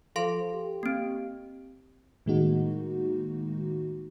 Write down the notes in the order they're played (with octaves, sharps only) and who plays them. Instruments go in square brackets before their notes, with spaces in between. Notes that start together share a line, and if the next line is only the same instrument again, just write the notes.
[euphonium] F3 [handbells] A4 F5 C6
[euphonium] G4
[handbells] A#3 C4
[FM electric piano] A2 D#3 G#3 A#3 D#4 F#4